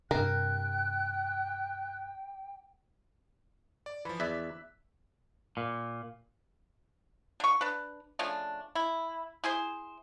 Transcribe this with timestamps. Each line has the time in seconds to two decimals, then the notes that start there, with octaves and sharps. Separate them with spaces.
0.11 G2 C3 A#4 G5 F#6
3.86 D5
4.05 E3 F3 B5
4.20 E2 D5 E5 E6 F#6 B6
5.57 A#2
7.40 D3 C#6
7.61 D4 B4
8.19 C#3 F3 A3 D4
8.75 E4
9.44 E4 G#4 C5